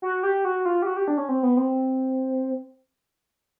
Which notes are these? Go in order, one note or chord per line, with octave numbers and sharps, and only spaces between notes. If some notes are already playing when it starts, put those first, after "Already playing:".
F#4
G4
F#4
F4
G4
F#4
G4
D4
C#4
C4
B3
C4